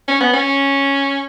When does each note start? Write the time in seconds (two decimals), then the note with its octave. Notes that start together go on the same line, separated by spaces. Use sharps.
0.08 C#4
0.20 B3
0.33 C#4